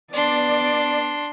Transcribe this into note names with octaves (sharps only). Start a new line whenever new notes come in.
B3 D4 D5 C6